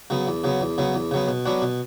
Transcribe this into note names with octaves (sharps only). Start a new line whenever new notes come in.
C#3 F#3 B3
E2
C#3 F#3 B3
E2
C#3 F#3 B3
E2
C#3 F#3 B3
B2
F#3 B3 D4 F#4
B2